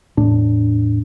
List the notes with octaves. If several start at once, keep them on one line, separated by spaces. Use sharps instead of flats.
E2 A2 D4